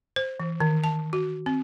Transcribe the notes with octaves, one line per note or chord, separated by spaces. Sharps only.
C5
E3
D#3
A5
F#4
C4